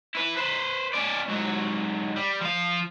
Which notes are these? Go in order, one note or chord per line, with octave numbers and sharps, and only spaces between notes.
E4 B4
B4 C5
C#4 D5
G#2 F#3
G3
F3 F5